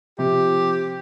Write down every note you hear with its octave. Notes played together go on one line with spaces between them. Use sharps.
C3 F3 G4